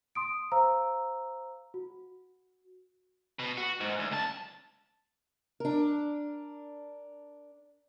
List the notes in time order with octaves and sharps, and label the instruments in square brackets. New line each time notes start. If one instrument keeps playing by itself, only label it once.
[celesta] C6 D#6 D7
C5 F5 A#5 E6
F#4
[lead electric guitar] B2
F#4
G#2
D2
C#2 A5
[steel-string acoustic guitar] D4 A#4